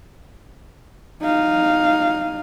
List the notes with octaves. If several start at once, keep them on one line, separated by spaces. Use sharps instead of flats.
D#4 F5